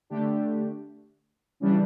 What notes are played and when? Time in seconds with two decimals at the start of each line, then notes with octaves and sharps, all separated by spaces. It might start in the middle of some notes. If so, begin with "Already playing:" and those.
0.10 D3 A3 D4 G4
1.60 C#3 E3 G3 D4